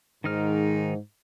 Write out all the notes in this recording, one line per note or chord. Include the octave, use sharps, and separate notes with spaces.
G#2 D#3 D#4 F6